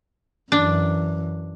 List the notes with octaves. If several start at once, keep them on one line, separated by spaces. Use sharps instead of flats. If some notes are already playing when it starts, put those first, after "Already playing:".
F#2 E3 D4